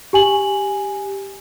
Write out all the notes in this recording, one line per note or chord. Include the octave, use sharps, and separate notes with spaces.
G4 G#5 F#7